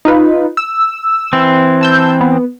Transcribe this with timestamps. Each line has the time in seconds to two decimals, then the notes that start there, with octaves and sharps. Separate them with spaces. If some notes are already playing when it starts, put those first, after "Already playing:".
0.05 D#4 F4 B4
0.57 E6
1.33 E3 C4
1.81 A5 E6 G6
2.21 B3